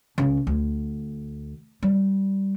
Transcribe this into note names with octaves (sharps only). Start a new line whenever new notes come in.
C#2
D2
G3